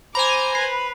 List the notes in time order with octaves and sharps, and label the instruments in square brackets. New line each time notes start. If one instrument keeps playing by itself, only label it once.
[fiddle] C5 [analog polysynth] G#5 A#5 [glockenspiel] B5 F7 [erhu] D6
[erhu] B4 [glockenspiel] C7